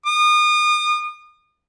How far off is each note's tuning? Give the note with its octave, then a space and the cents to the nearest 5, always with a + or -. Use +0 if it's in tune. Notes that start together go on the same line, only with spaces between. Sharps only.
D#6 -35